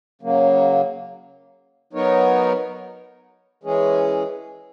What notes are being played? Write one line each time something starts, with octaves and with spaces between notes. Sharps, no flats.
C#3 F#3 A#3
F#3 B3 D#4 A#4 C#5
E3 G#3 C#4 G#4